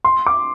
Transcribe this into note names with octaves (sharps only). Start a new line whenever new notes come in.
C6
D6